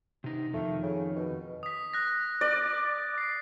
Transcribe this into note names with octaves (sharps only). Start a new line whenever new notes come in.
C3 D#4
F2 D#3 A3
C#3
B2
D#6 B6
F#6 A#6
D5
C7